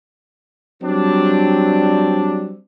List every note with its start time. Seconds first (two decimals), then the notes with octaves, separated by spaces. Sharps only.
0.82 F#3 G3 C4 D4